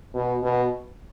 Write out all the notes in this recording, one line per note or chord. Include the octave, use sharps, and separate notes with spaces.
B2
B2